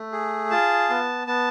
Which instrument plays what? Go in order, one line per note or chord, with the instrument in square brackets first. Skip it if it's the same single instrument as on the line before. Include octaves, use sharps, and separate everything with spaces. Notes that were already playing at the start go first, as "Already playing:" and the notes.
Already playing: [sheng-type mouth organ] A3
G#4
F4 A5
B3
B3 A5